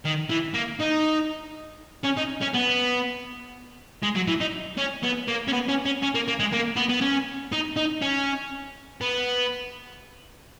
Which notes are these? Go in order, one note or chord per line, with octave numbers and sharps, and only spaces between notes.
D#3
E3
A#3
D#4
C#4
D#4
C#4
B3
G#3
F#3
E3
D#4
C#4
B3
A#3
C#4
B3
C#4
C#4
C#4
A#3
A#3
G#3
A#3
B3
B3
C#4
D#4
D#4
C#4
B3